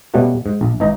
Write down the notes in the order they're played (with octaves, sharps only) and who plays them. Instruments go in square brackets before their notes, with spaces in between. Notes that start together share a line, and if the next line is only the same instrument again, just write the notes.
[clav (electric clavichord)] B2 G3 A3 B3 C#4 F#4
G#2
A#1
G#1 E3 D#4 D#5 A#5